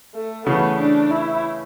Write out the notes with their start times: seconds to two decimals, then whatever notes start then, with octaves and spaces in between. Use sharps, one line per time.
0.14 A3
0.46 C#3 E3 A3 B3
0.79 D4
1.11 E4